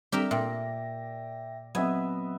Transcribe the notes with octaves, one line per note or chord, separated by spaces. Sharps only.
G3 C4 D4 G4 A#4 D5 E5 D6
A#2 E5 G5 A#6
F#3 B3 C4 D#5 E5 G#5